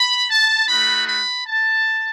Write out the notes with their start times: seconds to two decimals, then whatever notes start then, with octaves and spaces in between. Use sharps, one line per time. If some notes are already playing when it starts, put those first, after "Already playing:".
Already playing: B5
0.29 A5
0.68 A3 D#4 F#4 B5
1.07 B5
1.45 A5